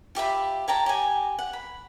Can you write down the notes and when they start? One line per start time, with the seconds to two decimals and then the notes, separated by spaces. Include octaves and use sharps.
0.15 F4 G4 E5 B5
0.68 C#5 G5 A5 A#5
0.86 G4 G#5
1.39 F#5
1.53 B5